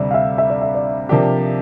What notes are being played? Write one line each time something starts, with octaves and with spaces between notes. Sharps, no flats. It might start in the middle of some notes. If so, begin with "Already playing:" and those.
Already playing: D2 C3 G3 D5 E5
F5
E5
E5
D5
E5
D5
C3 F3 A#3 D4 G4